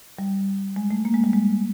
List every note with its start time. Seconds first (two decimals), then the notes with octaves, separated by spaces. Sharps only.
0.19 G3
0.76 G#3
0.91 A3
1.05 A#3
1.14 G#3
1.24 G3
1.33 G#3